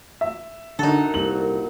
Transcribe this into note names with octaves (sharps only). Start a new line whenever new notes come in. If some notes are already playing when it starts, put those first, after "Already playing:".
E5
F#2 D3 D#4 F#4 A4
C2 A#2 F#7